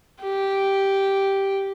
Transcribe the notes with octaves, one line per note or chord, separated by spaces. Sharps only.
G4